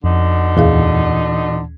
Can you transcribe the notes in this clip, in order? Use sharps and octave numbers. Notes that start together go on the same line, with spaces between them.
F2 B2 D3 D#4
D#2 A#2 E3 G#4 F5